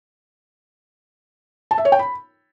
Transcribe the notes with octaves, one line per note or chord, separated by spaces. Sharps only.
A5
E5
C#5
G5
B5